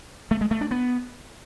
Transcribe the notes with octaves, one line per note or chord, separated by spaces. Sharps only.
A3
G#3
A3
D4
B3